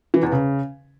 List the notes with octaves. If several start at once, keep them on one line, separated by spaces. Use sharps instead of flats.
E3
E2
C#3